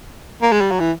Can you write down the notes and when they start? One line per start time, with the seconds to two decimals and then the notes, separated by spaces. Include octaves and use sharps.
0.42 A#3
0.52 G#3
0.61 G3
0.71 F#3
0.80 E3